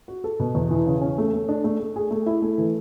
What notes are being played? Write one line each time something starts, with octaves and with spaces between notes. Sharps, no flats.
F#4
A4
B2
E2
E3
C#3
C#4
A3
A3
D4
A3
A3
G#4
A3
E4
A3
E3